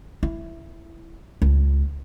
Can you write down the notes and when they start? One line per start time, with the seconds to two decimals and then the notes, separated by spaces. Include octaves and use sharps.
0.23 E4
1.42 C#2